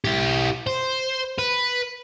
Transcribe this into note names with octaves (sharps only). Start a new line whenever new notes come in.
E4 G4
C5
B4